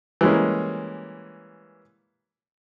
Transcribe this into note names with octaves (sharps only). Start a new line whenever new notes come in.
E3 G3 G#3 A#3 C#4